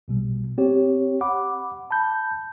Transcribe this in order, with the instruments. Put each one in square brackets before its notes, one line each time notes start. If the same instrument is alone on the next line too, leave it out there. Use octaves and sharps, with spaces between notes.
[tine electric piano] B1 B2 G3
C4 G4 C#5
F#5 B5 D6
A5 B5 G6